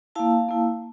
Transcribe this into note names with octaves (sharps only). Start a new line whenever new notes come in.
A#3 E4 F5 A5
A#3 E4